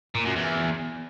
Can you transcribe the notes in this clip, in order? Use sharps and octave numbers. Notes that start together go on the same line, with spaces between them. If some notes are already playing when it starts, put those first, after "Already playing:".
A#2
F#2
E2